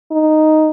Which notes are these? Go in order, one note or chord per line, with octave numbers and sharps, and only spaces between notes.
D#4